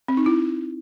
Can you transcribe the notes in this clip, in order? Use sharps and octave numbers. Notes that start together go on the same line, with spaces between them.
C4
D#4
E4